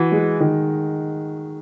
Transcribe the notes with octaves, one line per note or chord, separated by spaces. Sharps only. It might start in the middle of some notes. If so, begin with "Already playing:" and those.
Already playing: E3 F#4
G#3
D#3